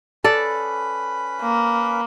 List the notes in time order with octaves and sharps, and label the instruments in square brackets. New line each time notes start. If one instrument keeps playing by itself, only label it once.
[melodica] C#4 B4 B5 [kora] A4 D5
[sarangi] A#3